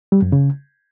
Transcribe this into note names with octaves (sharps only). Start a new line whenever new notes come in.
G3
F#2
C#3